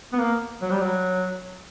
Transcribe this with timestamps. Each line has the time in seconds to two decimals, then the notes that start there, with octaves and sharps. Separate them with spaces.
0.13 B3
0.19 A#3
0.62 F#3
0.71 G3
0.81 F#3